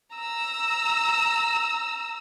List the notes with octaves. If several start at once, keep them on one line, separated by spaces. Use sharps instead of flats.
A#5 E6